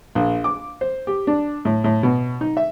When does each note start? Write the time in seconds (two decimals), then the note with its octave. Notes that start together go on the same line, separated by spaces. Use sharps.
0.15 A#1
0.44 D6
0.81 C5
1.07 G4
1.27 D4
1.65 A2
1.84 A2
2.03 B2
2.41 D#4
2.57 E5